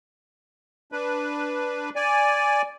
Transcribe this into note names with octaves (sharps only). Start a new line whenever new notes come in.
D4 B4
D5 G#5